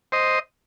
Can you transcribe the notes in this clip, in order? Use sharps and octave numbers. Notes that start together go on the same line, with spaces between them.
C5 D#5